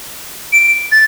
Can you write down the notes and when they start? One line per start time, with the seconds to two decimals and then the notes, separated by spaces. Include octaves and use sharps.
0.53 D7
0.92 A6